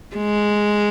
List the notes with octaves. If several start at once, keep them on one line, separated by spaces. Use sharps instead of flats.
G#3